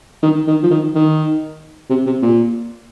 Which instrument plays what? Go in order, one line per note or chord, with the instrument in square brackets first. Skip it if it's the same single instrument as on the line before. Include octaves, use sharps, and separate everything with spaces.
[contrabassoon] D#3
D#3
F3
D#3
D#3
C3
C3
A#2